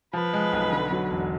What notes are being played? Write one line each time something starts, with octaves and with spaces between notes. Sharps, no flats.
F3 B4
G#3
B1
D3
F#3
E1